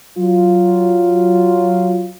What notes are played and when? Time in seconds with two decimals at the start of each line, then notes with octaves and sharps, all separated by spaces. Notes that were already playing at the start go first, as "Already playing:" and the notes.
0.18 F#3 F4